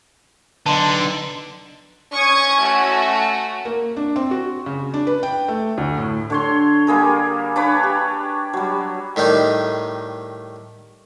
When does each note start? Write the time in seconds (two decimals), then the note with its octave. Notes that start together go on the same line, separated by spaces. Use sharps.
0.66 D3 B3 D#4 A5 C6
2.13 C#4 C#6 D#6 G#6
2.62 A3 F#4
3.65 A#3
3.97 D4
4.16 C4
4.31 F#4
4.66 C#3
4.94 D4
5.07 B4
5.23 G5
5.48 A3
5.78 D2
5.98 A2
6.30 D3 C#5 C6
6.87 G3 A#3 G#4 A#4
7.56 D4 B4 C#5 B5
7.83 G4
8.53 F#3 G3
9.16 A2 D#3 G3 D#4